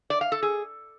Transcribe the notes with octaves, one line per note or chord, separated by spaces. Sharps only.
D5
F5
A4
G#4